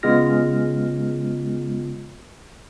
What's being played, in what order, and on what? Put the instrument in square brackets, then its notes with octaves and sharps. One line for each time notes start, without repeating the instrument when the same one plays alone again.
[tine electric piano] C#3 G#3 B3 F4 F6 A#6